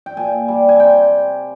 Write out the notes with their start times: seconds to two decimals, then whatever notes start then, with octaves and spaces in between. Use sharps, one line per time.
0.06 G5
0.17 A#2 G#5
0.48 G3
0.69 G#5
0.80 C3 G5